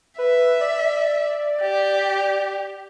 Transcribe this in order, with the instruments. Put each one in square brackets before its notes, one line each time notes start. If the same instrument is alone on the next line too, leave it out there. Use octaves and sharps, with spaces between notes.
[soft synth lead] B4 [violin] E5
[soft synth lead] D5
[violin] G4